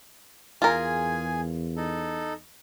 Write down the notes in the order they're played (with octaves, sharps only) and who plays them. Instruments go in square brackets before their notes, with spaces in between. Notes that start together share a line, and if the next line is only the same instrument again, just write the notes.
[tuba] E2 [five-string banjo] F4 A#4 [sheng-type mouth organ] G#4 G#5
[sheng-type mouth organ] D#4 A4